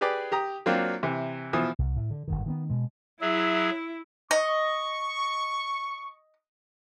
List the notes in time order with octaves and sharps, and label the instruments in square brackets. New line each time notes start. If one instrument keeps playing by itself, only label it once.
[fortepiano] G4 G#4 B4 D5
G4 A#5 D#6
F#3 A#3 C4 D4 F4
C3 E3
B2 E3 F3 D#6
[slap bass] C2
A2
D3
G1 G#2 D#3
D#3 A#3 B3
B2 G#3
[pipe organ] F#3 G#4 [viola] E4 [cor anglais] E5
[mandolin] D#5 [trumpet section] C#6